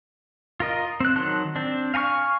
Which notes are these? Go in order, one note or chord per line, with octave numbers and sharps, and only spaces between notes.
F4 A#4 D#5
C4 F#6
D#3 F#3 A5 C6 F#6
C4 D4
F5 G#5 A#5 C#6 F6